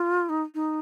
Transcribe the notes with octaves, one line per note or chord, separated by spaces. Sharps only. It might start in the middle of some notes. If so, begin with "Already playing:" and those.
Already playing: F4
D#4
D#4